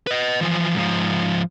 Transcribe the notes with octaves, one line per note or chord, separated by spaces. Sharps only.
B4 D#5
E3 F3
G#2 F3